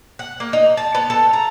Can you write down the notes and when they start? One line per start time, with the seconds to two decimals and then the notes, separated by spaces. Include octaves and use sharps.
0.19 F#5
0.40 A#3
0.53 D#4
0.77 A5
0.95 B3
1.10 A4
1.33 A#5